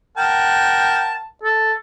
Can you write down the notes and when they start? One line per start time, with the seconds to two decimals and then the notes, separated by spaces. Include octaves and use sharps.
0.17 A#4 F#5 G5 A5
1.44 A4